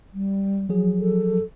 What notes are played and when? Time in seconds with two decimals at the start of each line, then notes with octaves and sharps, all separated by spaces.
0.14 G3
0.69 F3 F#3 G#4
1.00 A4